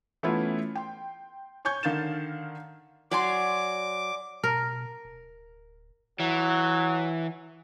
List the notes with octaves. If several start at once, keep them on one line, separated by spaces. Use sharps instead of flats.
E3 A3 B3 C#4 E4 F4
G5 C6
C#5 G#5 C#6 G6 G#6
D3 D#3 F5 G6 A6 E7
F#3 D5 G#5 C6 D6
B2 A#4
D1
E3 F#3